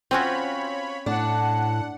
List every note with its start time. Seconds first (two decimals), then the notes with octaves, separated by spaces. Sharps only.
0.11 C4 C#4 F4 F#4 C#5 B5
1.06 A2 D4 F#5